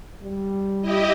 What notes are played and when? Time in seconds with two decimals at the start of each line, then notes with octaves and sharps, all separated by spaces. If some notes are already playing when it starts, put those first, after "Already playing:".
0.23 G3
0.81 E4 G4 D#5